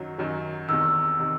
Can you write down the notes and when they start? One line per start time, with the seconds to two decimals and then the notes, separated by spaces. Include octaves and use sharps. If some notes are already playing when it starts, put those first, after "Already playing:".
Already playing: F#2 D#3 F#3
0.18 F#2 D#3 F#3
0.68 E2 C3 D#3 E6
1.19 C3 D#3